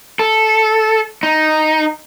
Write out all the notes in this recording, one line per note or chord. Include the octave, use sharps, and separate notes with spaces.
A4
D#4